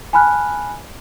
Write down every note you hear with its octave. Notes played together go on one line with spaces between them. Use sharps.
G#5 A5 B5 F6 F#6